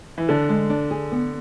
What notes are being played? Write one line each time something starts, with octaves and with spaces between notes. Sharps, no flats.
E3
D3 D4
G#3
D4
G#4
B3